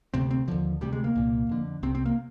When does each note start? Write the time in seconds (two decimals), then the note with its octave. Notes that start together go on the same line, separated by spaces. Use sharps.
0.14 D2 C3 C4
0.31 C4
0.48 D#2 D3 F3
0.81 D2 C3 G3
0.92 G#3
1.04 A#3
1.15 C2 A#2
1.49 F2 D3
1.83 C2 C3 C4
1.95 C4
2.06 A#3